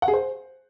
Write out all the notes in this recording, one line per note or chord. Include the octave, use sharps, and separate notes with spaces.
F#5
G#4
C5